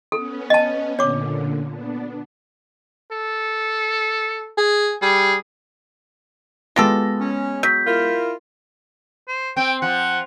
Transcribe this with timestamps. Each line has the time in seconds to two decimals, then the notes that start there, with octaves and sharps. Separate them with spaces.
0.12 B3 C#4 A4
0.50 D#5 A5
0.99 A#2 D3 C#5 D6
1.69 B3 D4
3.12 A4
4.58 G#4
5.02 G3 G#4
6.76 G#3 B3 F4 G4 A4 A#6
7.20 C#4
7.63 F#3 G6 B6
7.87 E4 F4 A#4
9.28 C5
9.57 C4 G5
9.82 F3 F#5